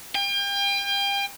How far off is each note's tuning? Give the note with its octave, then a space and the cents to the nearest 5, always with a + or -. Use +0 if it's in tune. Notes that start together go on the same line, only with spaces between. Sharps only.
G5 +35